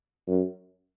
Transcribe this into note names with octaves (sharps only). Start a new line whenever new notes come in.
F#2